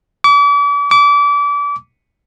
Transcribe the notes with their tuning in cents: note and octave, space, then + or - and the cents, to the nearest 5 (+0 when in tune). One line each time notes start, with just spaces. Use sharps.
D6 -40
D6 -30